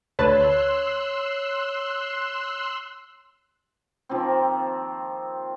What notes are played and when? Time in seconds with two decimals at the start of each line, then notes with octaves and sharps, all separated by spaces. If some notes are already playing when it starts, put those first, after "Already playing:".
0.19 D2 B4 C#5 A5 C6 E6 F#6
4.09 D#3 F3 A#3 C4